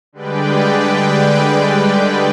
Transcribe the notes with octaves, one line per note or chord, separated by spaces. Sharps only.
D3 G3 G#3 B4 D5 G5